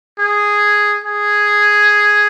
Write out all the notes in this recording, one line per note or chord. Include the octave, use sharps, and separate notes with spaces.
G#4
G#4